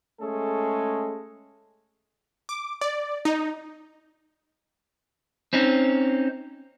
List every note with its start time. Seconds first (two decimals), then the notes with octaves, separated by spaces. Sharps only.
0.21 G#3 A3 C#4 G#4 A4
2.49 D6
2.81 D5
3.25 D#4
5.53 C4 C#4 D#4